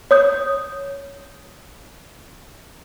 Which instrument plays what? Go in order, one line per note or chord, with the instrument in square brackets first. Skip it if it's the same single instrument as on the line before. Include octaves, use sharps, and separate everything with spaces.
[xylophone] C#5 D#6 G6